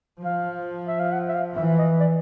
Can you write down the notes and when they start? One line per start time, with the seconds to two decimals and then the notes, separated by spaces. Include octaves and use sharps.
0.24 F3 F5
0.87 E5
1.00 F5
1.13 F#5
1.28 E5
1.34 F5
1.56 E3 E5
1.78 D#5
2.00 D5